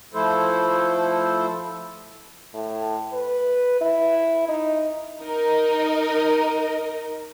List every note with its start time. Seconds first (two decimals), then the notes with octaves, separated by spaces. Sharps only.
0.14 F3 A3 E4 A4 C5
2.54 A2
3.13 B4
3.81 E4
4.48 D#4
5.22 D#4 A#4 D#5